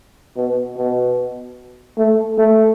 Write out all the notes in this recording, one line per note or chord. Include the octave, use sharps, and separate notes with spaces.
B2
B2
A3
A3